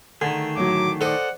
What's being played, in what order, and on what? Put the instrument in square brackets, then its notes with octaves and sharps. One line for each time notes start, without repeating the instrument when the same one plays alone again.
[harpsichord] D3 [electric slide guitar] D#3 A3 G#4
[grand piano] A1 F#3 [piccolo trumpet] D6
[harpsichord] A4 D#5 [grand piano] C5 D5 [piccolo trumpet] F#5